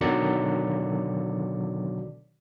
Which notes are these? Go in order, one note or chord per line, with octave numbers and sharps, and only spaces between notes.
B2 D3 D#3 F#3 D5 C#7